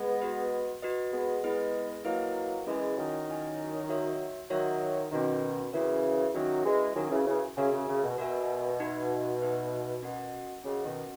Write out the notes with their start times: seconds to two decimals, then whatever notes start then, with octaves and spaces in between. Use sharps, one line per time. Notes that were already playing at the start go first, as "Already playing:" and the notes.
Already playing: G#3 B3
0.21 F#4 B4 D#5
0.82 F#4 B4 D#5
1.13 G#3 B3
1.43 G#3 B3 E4 B4 D#5
2.05 F#3 A#3 E4 B4 D#5
2.67 E3 G#3 C#4 E4 A#4 D#5 G#5
2.97 D#3 F#3
3.28 C#4 E4 A#4 D#5 G#5
3.89 F#4 C#5 E5
4.50 D#3 F#3 F#4 C#5 E5
5.12 B2 D#3 C#4 F#4 A#4
5.73 C#3 E3 C#4 F#4 A#4
6.34 D#3 F#3 C#4 F#4 A#4 E5 G#5
6.65 E3 G#3
6.96 D#3 F#3 C#4 F#4 A#4 E5 G#5
7.11 C#3 E3
7.27 C#3 E3
7.57 C#3 F#4 A#4 E5 G#5
7.73 C#3
7.88 C#3
8.03 B2
8.18 B2 F#4 A#4 E5 G#5
8.80 D#4 F#4 B4 E5
9.41 D#4 F#4 B4 E5
10.02 C#4 F#4 A#4 D#5 F#5
10.64 C#3 C#4 F#4 A#4 D#5 F#5
10.84 B2 D#3